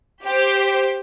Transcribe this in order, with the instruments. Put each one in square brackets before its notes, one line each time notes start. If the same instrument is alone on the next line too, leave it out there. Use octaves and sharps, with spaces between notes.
[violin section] G4 C5